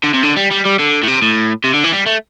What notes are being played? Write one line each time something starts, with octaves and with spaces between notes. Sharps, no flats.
D3
C3
D3
G3
G3
G3
D3
A2
C3
A2
C3
D3
E3
G3
A3